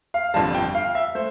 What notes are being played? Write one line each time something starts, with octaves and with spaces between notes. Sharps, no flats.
F5
G1 F2 D3 G3 A5
G5
F5
E5
A3 C5